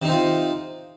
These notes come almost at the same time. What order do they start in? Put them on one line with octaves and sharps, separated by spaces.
C3 D#4 C4 F4